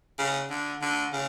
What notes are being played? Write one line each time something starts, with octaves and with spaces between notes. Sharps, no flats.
C#3
D3
D3
C#3